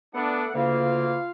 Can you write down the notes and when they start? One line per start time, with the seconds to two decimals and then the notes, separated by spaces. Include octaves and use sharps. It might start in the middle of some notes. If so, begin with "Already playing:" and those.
0.14 A3 B3 D4 A4 F#5
0.54 D2 C#3 A#3 F4 F5